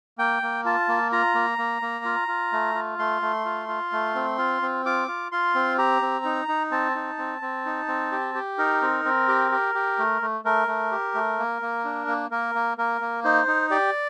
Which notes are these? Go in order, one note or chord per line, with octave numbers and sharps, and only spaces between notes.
A#3 G5
A#3
F4 A5
A#3
F4 A#5
A#3
A#3
A#3
F4
F4
A3
F4
A3 C6
A3
F4
F4
A3
C4
F4
C4
F4 D6
F4
F4 C6
C4
G4 A#5
C4
D#4
D#4
C4 A5
D#4
C4
C4
D#4
C4
G4
G4
D#4 A#4
C4
C4
G4
G4
G4
A3
A3
A3 A#4
A3
G4
A3
A#3
A#3
D4
A#3
A#3 A#4
A#3
A#3 A#4
A#3
D#4 C5
D#4
G4 D5